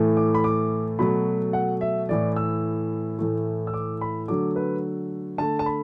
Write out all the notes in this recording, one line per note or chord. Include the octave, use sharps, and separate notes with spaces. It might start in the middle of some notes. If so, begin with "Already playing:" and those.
Already playing: A2 E3 A3
D6
B5
D6
B2 F#3 A3 B5
F#5
E5
A2 E3 A3 D5
E6
A2 E3 A3
E6
D6
B5
D3 F#3 A3 D6
B4
D3 A3 A5
A5
B5